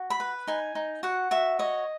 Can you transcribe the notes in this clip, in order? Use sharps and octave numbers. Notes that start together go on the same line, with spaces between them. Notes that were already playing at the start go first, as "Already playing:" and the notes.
Already playing: F#4
B5
B4
D#4 G#5
D#4
F#4 F#5
F#4 E5
C#5 D#5